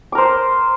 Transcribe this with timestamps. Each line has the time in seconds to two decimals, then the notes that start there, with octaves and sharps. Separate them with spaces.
0.12 D6
0.15 A#4
0.18 C5